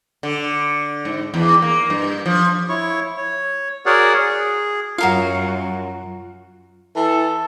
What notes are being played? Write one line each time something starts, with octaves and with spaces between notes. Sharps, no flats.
D3
G#2
E2
A#3
G2
F3
E4 C#5 C#6
C#5
F#4 G#4 A#4 C#5 D5 F#5
G#4
F#2 F#3 F4 F#4 A#4 F5
E3 A4